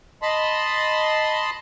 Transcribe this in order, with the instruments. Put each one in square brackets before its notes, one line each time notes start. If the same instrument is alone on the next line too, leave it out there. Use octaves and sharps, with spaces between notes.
[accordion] D#5 A5 B5 C6